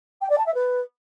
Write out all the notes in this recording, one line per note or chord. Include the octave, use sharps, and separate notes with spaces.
G5
D5
A5
E5
B4